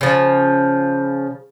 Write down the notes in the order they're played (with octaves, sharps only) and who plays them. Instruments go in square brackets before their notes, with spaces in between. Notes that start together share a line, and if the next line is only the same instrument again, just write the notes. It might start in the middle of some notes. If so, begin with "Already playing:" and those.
[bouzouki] C#3 F3